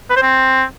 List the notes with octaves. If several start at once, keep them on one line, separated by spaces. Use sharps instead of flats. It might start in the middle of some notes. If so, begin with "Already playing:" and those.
B4
C5
C4